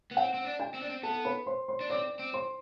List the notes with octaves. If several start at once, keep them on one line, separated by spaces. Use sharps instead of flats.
B3
C4 F#5
C4
D4
G5
C4
D4
C4
B3 A4 A5
B4 B5
C5 C6
C5 C6
D4
C4 D5 D6
C4
C5 C6